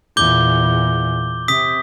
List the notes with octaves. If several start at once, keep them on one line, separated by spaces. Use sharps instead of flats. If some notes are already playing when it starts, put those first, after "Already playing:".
E2 A#2 D6 G6 G7
C3 D#6 B6